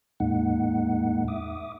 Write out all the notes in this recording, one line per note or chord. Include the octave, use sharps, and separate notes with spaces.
E2 A2 G#3 A#3 D#4 F#5
E5 D6 D#6